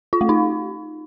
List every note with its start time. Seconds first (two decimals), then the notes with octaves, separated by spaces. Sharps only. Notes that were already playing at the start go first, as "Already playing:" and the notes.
0.13 F4
0.21 A3
0.29 D#4